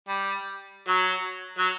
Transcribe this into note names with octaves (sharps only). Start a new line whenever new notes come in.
G3
F#3
F#3